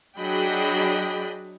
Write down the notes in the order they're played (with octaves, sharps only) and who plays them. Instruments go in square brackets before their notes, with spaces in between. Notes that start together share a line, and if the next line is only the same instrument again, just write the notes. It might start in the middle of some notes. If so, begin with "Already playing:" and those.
[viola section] F#3 D4 G#4 D#5 G5 B5